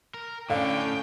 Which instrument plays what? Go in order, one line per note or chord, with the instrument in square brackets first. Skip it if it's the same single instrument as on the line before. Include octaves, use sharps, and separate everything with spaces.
[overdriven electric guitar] A#4
[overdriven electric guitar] A2 [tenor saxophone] D3 [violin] C#4 G5 [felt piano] F5